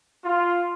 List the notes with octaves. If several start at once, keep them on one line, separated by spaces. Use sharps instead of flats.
F4